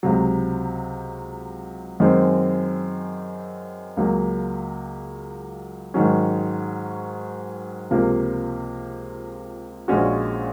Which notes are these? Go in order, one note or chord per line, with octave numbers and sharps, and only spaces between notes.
C#2 C3 F#3
F#2 D#3 G#3 C4
C#2 C#3 F#3 A#3
G#2 D#3 F#3 C#4
C#2 C3 F3 A#3 F4
A#1 A#2 G#3 C#4 F#4